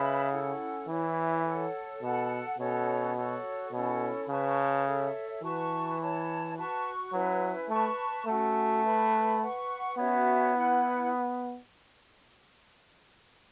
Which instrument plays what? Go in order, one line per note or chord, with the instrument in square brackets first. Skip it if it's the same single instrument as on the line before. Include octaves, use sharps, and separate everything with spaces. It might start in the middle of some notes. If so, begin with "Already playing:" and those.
Already playing: [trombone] C#3 [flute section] B4 E5 B5
[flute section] C#4 E4 A4 F#5
[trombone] E3 [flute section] E4 C#5 E5
[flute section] A4 C#5 F#5
[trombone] B2 [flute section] A4 F#5 A5
[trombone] B2 [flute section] C#4 F#4 A4 C#5
[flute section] F#4 A4 C#5
[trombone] B2 [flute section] C#4 E4 A4 C#5
[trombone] C#3 [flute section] B4 A5 C#6
[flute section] A4 C#5 E5
[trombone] E3 [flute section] F#4 B4 A5 C#6
[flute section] E4 C#5 A5
F#4 B4 A5 C#6
[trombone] F#3 [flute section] C#4 E4 B4
[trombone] A3 [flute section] B4 A5 C#6
[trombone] A3 [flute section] C#4 F#4 A4 F#5
[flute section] B4 E5 B5
B4 F#5 C#6
[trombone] B3 [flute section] C#4 F#4 C#5 E5
[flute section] E4 B4 F#5